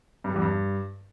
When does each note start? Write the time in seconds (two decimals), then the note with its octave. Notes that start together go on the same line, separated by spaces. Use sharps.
0.24 G2
0.30 G3
0.36 E2
0.42 G2